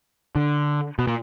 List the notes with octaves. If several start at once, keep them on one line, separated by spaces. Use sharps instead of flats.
D3
B2
A#2